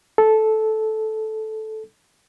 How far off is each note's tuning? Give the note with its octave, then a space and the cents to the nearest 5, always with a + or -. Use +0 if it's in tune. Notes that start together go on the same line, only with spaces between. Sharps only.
A4 -10